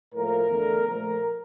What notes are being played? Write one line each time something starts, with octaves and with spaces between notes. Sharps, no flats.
A2 F3 A#3 A#4
E2 D3 A3
A#2 F3 A3 A#4